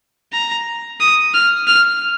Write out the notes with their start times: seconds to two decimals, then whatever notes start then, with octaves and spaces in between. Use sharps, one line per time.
0.33 A#5
1.00 D#6
1.34 F6
1.67 F6